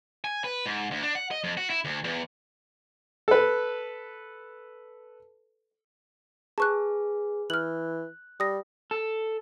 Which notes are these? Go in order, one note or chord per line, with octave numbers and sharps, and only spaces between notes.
G#5
B4
G#2
D2
D4
F#5
D#5
F2
F#4
E4
D2
E2
A4 B4
G#4 B4 A5 C#6 F#6
E3 F6 F#6 F#7
G3 D#6 A#6
A4